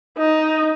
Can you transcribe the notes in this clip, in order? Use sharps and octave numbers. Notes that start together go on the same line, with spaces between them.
D#4